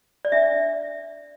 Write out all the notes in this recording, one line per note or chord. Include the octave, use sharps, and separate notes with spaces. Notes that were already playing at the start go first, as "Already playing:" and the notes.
D5
D4 E5